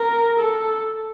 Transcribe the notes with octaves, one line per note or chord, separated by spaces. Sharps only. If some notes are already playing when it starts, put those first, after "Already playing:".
Already playing: A#4
A4